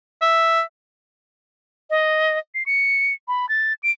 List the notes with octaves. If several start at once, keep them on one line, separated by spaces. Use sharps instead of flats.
E5
D#5
C7
C#7
B5
A6
D7